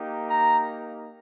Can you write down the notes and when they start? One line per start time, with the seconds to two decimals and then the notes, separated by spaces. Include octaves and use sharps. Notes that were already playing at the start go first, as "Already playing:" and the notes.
Already playing: A#3 D#4 G4
0.28 A#5